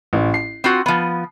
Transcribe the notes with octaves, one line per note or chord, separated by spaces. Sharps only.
A1
C7
C4 F4 F#4
F3 B3